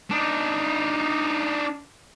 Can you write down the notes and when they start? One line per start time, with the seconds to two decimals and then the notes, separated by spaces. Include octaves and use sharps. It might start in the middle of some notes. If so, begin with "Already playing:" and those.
0.11 D4 D#4